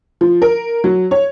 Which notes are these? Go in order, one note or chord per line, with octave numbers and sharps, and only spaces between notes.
F3
A#4
F#3
C#5